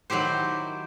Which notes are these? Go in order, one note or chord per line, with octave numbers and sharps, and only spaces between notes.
D#3 F#3 E4 G4 C5